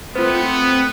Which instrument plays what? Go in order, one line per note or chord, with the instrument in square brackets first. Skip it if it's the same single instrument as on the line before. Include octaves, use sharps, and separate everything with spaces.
[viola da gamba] A3 [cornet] B3 [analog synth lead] C4 [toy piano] F4 B4